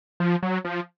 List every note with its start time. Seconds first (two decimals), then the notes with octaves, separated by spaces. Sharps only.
0.20 F3
0.43 F#3
0.65 F3